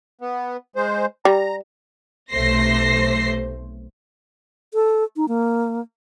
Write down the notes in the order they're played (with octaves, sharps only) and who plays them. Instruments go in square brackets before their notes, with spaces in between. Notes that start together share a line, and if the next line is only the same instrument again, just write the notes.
[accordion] B3
G#3 C5
[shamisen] G3 [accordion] A#5
[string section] B1 C3 A3 C5 A#6 C7
[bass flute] A4
D#4
A#3